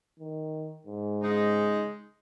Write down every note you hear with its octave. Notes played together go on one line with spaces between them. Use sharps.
D#3
G#2
C#3 G#3 D#4